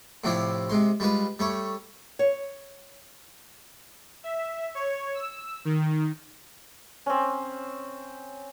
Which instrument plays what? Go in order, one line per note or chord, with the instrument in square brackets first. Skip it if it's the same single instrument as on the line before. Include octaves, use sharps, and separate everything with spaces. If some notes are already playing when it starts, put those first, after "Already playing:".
[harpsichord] A2 C3 F3 D4 E4
C3 G#3 C6
G3 G#3 F4 B4
G3 A3 C#5
[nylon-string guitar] C#5
[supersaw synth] E5
C#5
E6
D#3
[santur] C4 C#4